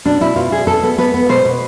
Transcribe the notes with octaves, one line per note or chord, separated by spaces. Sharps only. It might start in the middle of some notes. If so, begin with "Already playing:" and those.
B2 D4
B2 E4
B2 F4
B2 G#4
B2 A4
B3
B3 B4
B3
B2 C5
B2